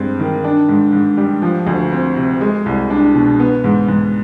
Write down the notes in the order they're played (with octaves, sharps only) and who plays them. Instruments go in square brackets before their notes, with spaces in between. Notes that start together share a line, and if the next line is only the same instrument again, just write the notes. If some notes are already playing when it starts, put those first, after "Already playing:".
Already playing: [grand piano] G2 G#3 C4
D#3
D4
G#2
G#2
G3
F3
D2
C4
C3
G#3
C2
D4
B2
B3
G#2
G#2